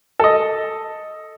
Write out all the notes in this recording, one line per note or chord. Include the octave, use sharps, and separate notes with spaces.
A4 D#5